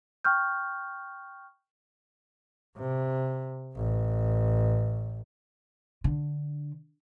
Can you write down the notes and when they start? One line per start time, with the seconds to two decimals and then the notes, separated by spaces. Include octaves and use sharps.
0.25 G5 C#6 F6 G6
2.78 C3
3.76 A1
6.04 D3